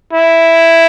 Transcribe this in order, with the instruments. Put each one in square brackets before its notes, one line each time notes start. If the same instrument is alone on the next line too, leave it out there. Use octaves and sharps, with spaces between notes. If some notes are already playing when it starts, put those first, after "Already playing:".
[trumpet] E4